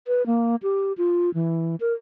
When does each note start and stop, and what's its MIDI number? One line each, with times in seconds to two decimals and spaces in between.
0.07 0.26 71
0.26 0.56 58
0.63 0.93 67
0.98 1.33 65
1.34 1.76 52
1.80 1.93 70